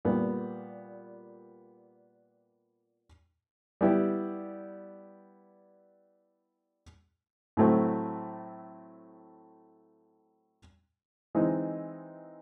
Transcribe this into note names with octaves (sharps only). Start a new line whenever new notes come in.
A#2 G3 B3
G3 B3 E4 G4
A2 F#3 A3 C4
E3 G#3 C4 D#4